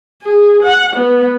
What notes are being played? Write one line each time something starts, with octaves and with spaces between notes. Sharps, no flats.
G#4
F#5
B3